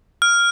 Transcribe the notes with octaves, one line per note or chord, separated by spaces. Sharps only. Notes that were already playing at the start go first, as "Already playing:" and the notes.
F6